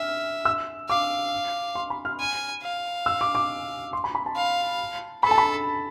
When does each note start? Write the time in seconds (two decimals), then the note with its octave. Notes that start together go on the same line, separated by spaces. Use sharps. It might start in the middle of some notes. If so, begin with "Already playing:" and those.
Already playing: E5 F6
0.45 E6
0.89 F5 D6
1.75 C6
1.90 B5
2.05 F6
2.20 G#5
2.62 F5
3.06 E6
3.21 D6
3.35 D6
3.93 C6
4.04 B5
4.15 B5
4.26 A5
4.36 F5
5.23 A4 B5
5.31 A5
5.38 B5